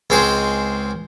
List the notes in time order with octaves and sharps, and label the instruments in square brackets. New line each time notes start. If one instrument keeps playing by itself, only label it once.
[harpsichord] C#2 G#3 C4 G#4 C5